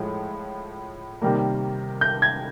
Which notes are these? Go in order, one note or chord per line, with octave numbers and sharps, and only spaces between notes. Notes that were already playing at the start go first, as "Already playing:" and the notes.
Already playing: A2 F3 G#3
C3 D#3 G3 A#3
G6
G#6